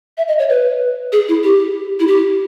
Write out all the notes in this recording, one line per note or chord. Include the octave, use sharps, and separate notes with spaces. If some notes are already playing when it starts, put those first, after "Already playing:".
E5
D#5
C#5
B4
G#4
E4
G4
E4
G4